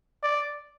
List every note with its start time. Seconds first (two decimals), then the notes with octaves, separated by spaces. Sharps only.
0.23 D5